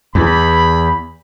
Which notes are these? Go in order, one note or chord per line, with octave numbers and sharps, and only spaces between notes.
E2 B5